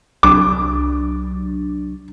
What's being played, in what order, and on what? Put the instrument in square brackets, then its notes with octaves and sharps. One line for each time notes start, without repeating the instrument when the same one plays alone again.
[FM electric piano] C2 F#3 D4 [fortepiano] D6